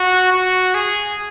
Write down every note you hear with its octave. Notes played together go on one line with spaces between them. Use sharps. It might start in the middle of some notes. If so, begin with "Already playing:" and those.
Already playing: F#4
F#4
G#4